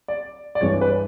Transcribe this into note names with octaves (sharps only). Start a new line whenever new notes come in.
D5
D5
G2 E3 G#3 C#5
B4